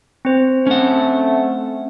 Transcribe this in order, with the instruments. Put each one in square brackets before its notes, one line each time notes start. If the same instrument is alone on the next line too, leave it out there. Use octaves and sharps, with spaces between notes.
[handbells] C4 C5
[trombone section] A3 [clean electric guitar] C#4 F#5